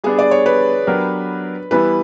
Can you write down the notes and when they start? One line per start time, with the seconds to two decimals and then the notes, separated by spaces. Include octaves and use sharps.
0.04 G3 B3 D4 G#4
0.19 D5
0.31 C#5
0.46 B4
0.87 F#3 B3 D4 G4 A#4
1.71 E3 G3 B3 E4 B4